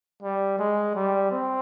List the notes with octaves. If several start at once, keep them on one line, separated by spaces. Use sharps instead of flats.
G3
G#3
G3
C4